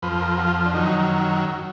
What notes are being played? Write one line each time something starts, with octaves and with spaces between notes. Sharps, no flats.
F2 F3 B4
A#4
F#4
F4
D4
F#2 D#3 F#3 D#4